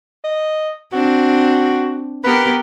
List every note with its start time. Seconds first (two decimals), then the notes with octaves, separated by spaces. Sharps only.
0.24 D#5
0.93 C4 D4 F#4
2.24 B3 G4 A#4 B4